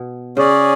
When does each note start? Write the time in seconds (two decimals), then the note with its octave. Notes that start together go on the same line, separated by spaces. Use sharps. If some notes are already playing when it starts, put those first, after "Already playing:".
Already playing: B2
0.37 C#3 C#4 G#4 D5